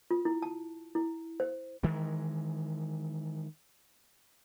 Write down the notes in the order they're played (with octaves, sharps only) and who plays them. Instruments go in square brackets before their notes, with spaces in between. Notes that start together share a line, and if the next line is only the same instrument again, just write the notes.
[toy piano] F4
E4
A5
E4
C5
[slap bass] D#3 E3 G#3